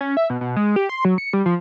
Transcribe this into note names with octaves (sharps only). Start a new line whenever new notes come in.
C#4
E5
B2
B2
G#3
G4
C6
F#3
C#7
G3
F3